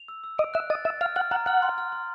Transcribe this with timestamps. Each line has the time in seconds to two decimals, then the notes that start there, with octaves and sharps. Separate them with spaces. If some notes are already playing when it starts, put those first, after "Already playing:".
Already playing: F7
0.08 E6
0.24 E6
0.38 D#5 D7
0.54 E5 F#6
0.70 D#5 A6
0.85 E5 A6
1.01 F5 F6
1.16 F#5 F6
1.31 F#5 A#5
1.46 F#5 F6
1.62 C6
1.78 F6
1.92 C6